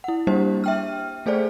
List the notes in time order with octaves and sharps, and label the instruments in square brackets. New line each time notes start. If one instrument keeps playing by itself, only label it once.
[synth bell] E4 F#5
G3 A#3 D4 G4 C5
E5 G5 F6
A3 G#4 A4 C5 D5